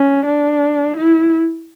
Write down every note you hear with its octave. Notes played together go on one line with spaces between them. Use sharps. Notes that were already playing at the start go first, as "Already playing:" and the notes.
Already playing: C#4
D4
E4